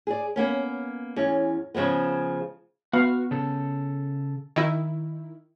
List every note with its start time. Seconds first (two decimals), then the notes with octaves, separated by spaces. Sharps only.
0.07 G#4 D5
0.36 A#3 B3 C#4
1.16 E2 C#4
1.75 C#3 F3 G#3 B3
2.93 B3 F#4 F5
3.31 C#3 A4
4.56 D#3 E4